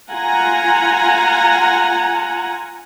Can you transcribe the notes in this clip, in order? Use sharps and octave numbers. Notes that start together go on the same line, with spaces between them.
F4 F#5 G#5 A#5